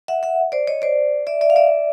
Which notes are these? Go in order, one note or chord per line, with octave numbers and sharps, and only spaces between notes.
E5 F#5
E5 F#5
C5 D5
C#5 D#5
C5 D5
D5 E5
D5 E5
F5
D5 E5